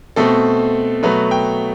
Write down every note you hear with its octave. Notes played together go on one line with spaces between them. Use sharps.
B2 A3 C4 A4
B2 F#3 A3 B4
G5